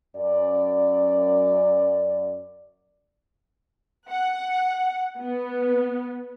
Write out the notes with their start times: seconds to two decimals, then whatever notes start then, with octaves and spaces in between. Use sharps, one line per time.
0.15 F#2 D5
4.10 F#5
5.20 B3